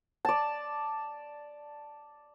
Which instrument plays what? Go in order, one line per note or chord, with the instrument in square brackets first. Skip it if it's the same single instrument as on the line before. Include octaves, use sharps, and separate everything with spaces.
[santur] D5 A5